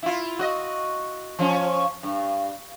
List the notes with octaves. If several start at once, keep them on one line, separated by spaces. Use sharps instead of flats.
E4 F4
F#4 D#5
F3 C#4
G2